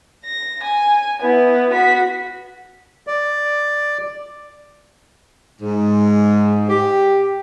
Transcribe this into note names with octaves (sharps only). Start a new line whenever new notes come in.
A#6
G#5
B3 E4
F#4 B6
D5
G#2
G4